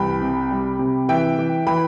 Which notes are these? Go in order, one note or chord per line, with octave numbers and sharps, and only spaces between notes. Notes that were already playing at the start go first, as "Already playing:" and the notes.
Already playing: C2 E3 G5 B5
C3
G3
C3
E3 E5 G5
E3
E3 G5 B5